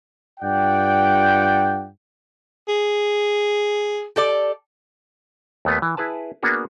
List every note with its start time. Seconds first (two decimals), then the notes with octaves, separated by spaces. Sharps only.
0.40 G2 F4 D5 F#5 G5
2.68 G#4
4.16 G4 A4 D5
5.65 D#2 A3 B3 B4
5.82 E3
5.97 E4 G#4 B4 A5
6.43 A#3 B3 D4 F#4 G#4